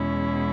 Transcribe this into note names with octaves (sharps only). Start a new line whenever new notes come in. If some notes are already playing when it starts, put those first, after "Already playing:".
Already playing: E2 B2 G#3 C#4 E4